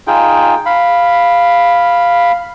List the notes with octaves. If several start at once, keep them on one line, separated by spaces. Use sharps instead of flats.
D#4 F4 G#4 G5
F5 B5